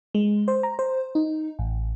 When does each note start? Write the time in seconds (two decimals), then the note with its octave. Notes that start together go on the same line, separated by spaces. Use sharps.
0.15 G#3
0.48 C5
0.63 A#5
0.79 C5
1.15 D#4
1.59 A1